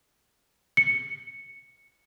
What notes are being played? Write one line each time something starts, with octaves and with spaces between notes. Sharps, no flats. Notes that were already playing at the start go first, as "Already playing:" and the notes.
C#7